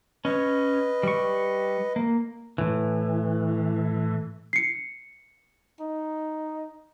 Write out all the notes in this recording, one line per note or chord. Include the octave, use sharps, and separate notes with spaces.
C#4 B4 C#5 D#5
G3 C#6
A#3
A2 E3
C7 C#7
D#4